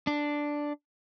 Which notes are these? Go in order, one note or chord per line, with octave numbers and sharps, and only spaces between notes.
D4